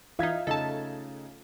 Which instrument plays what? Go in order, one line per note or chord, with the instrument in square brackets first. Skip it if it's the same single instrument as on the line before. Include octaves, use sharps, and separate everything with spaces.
[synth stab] E3 D#4 [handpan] F4 F5 [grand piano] E5 G#6 B6
[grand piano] C#3 A3 D#4 [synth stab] A4 A5